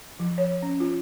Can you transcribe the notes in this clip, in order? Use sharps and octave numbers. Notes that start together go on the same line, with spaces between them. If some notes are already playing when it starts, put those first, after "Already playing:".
F3
C#5
C#4
F4